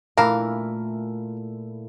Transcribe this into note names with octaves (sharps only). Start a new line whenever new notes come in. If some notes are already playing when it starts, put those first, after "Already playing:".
A#2 E3 A3 D4 E4 A#4 F5